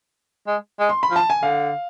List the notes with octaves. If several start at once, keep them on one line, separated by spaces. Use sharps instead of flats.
G#3
G#3
C6
B5
F3
A5
G#5
D3 F5